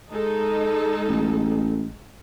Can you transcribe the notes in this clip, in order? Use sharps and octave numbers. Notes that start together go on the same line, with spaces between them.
G#3 D#4 A4
A1